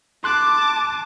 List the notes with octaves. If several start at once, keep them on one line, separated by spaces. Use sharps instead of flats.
A5 C6 D6 F#6